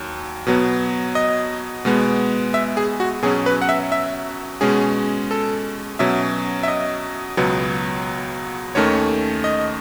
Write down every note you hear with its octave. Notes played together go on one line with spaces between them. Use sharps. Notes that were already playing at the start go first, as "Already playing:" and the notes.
Already playing: D#2 F#3
B2 F#3 B3
D#5
B2 G#3 B3
E5
G#4
F#4
B2 F#3 C#4 G#4
B4
F#5
E5
E5
B2 G#3 C#4 G#4
A4
B2 F#3 C#4 E5
E5
D#5
C#2 B2 F#3 B3
D#2 D#3 A3 C#4 C#5
D#5